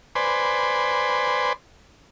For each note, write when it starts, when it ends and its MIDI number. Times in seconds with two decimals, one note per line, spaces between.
0.15 1.53 71
0.15 1.53 72
0.15 1.53 74
0.15 1.53 80
0.15 1.53 83
0.15 1.53 84